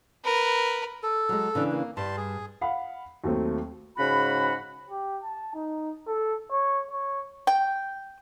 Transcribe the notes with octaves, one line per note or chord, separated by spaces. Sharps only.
A#4 B4
A4
F#3 G#3
C#3 E3 D4
A#3
G2 G3 A5 C6
G#4
F5 F#5 B5
D#2 F#3 A3 C4
G#2 C#3 F#4 B5
G4
A5
D#4
A4
C#5
C#5
G5